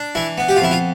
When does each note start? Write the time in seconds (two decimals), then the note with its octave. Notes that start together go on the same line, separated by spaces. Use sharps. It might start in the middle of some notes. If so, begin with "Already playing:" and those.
Already playing: D4
0.15 E3 E4
0.38 B3
0.49 G4
0.56 F4
0.60 F2 E4
0.71 F4